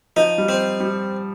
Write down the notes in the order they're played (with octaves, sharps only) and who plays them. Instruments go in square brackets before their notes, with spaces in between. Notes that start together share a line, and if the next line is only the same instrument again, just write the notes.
[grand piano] F3 [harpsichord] D#4
[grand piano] G3
[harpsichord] C4
[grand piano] G3